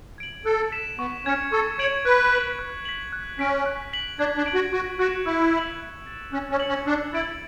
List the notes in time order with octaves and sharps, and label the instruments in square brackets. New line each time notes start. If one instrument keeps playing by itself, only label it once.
[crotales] G#6 D7 F#7
[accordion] A4 [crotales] F#6
[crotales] B6 E7
[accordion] B3 [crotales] C#6
[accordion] C#4 [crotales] G#6 C#7
[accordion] A4 [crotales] C#6
[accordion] C#5 [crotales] G#6 D7 F#7
[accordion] B4 [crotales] F#6
[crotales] B6 F#7
F#6
B6 F#7
F#6
[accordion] C#4 [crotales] B6 D7
[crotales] F#6
B6 F#7
[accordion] D4 [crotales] G#6
[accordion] D4
[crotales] D7 F#7
[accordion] F#4
[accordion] F#4 [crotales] C#6
[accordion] F#4 [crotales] F#6 C#7 E7
[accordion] E4 [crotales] E6
[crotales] G#6 D7 F#7
F#6
A6 E7
[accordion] C#4 [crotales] F#6
[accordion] C#4
[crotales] C#7 F#7
[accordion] C#4
[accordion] D4 [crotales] E6
[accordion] E4 [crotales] A6 D7 F#7